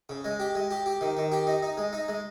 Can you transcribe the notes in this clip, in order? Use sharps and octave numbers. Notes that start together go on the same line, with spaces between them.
C#3
G#3
G4
G#3
G4
G4
D#3
D#3
G4
D#4
D#4
G#3
D#4
G#3